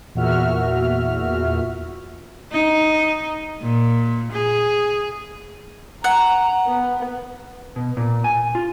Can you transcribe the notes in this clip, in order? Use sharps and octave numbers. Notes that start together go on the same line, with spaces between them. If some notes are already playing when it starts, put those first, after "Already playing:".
E2 A#2 F#4 E5 F6
D#4
A#2
G#4
F#5 A#5
B3
B2
A#2
G#5
F4